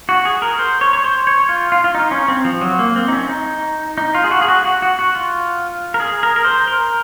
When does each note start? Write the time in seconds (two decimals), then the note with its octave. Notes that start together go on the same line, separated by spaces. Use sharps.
0.09 F#4
0.25 G#4
0.42 A#4
0.59 C5
0.81 C#5
0.93 C#5
1.04 C5
1.27 C#5
1.49 F4
1.72 F4
1.84 F4
1.95 D#4
2.11 C#4
2.28 C4
2.45 F3
2.61 F#3
2.79 A#3
2.96 C4
3.08 D#4
3.13 C#4
3.29 D#4
3.98 D#4
4.15 F4
4.24 G#4
4.31 F#4
4.41 G#4
4.48 F#4
4.65 F#4
4.82 F#4
4.99 F#4
5.15 F4
5.94 A#4
6.00 G#4
6.23 A#4
6.36 A#4
6.45 C5
6.67 A#4